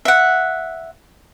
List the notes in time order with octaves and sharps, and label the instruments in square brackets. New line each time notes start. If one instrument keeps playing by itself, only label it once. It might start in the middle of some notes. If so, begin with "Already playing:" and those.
[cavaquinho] E5 F#5